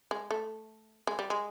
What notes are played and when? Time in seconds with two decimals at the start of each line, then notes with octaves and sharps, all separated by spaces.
0.11 G#3
0.31 A3
1.07 G#3
1.19 G3
1.30 G#3